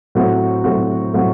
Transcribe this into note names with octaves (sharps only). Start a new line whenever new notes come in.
A2 F#3 C4 F#4
A2 F#3 C4 F#4
A2 F#3 C4 F#4